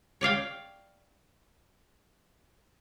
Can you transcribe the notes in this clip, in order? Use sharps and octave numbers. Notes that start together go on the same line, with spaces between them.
C#5 D5 F5 G5